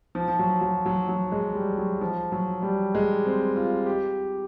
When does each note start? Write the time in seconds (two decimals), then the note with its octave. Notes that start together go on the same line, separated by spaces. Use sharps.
0.15 F3
0.28 F3
0.39 F#3
0.61 F#3
0.86 F#3
1.08 F#3
1.32 G#3
1.55 G3
1.78 F#3
2.01 F3
2.32 F#3
2.62 G3
2.95 G#3
3.25 C4
3.56 F4
3.86 G4